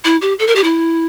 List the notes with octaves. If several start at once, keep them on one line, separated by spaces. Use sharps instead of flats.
E4
G4
A4
A#4
G4
E4